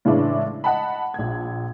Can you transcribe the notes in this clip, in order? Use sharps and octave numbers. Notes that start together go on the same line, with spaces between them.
A2 C#3 E3 G#3 D4 E4
D#5 F#5 A5 B5
A#1 G#6